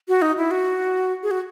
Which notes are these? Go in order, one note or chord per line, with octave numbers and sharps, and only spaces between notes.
F#4
D#4
E4
F#4
G#4
F#4